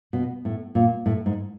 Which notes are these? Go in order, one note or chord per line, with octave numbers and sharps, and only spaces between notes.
B2
A2
A#2
A2
G#2